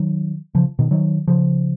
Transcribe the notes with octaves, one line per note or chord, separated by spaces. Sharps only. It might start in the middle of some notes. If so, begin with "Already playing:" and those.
Already playing: D#3 F#3
C#3 F3
B2 D#3
D#3 F#3
C#3 F3